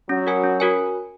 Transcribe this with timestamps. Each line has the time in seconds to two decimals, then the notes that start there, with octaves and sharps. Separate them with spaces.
0.09 F#3 C#4
0.27 F#4 A#4 C#5 G#5
0.43 C#4
0.60 F#4 A#4 C#5 G#5